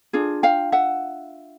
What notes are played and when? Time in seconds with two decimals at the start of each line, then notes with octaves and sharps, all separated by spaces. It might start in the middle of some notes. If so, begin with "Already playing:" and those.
0.13 D4 F4 G#4
0.43 F5 G5
0.72 E5 F#5